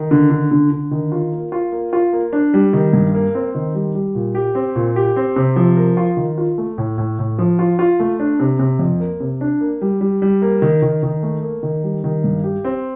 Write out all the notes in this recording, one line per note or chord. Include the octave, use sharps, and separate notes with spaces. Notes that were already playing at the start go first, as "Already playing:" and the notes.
Already playing: D#3
D3
D3
D3
D3
D#3
F4
A#3
F4
A#3
F4
A#3
D4
G3
D#3
G2
A#3
C4
D#3
G3
G3
A#2
G4
C4
A#2
G4
C4
C3
F3
A#4
F4
D#3
F4
A3
A2
A2
A2
F3
F4
F4
A3
D4
C3
C3
F2
A#3
C3
D4
A#3
G3
G3
G3
A#3
D#3
D#3
D#3
A3
A#3
D#3
G3
D#3
G2
G4
C4